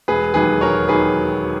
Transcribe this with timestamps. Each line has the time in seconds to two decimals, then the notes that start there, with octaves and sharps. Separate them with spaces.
0.08 E1 G#4 B4
0.34 D#2 D#3 F#3 G#4 B4
0.61 E1 A#4 C#5
0.88 D#2 D#3 F#3 G#4 B4